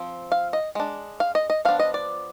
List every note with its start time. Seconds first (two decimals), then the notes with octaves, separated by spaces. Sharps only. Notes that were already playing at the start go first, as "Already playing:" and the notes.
Already playing: F3 C4
0.32 F5
0.53 D#5
0.75 G#3 D4
1.20 F5
1.35 D#5
1.50 D#5
1.65 F3 B3 D4 F5
1.79 D#5
1.94 D5